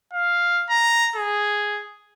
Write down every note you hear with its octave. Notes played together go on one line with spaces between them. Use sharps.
F5
A#5
G#4